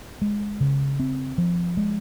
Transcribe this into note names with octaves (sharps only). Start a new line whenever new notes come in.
G#3
C#3
C4
F3
G#3